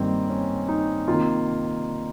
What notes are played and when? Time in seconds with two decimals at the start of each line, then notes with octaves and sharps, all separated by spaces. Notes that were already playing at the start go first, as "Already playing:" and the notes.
Already playing: G2 D#3 G3 A#3 C4
0.29 C#4
0.68 D#4
1.08 C3 D#3 A#3 F4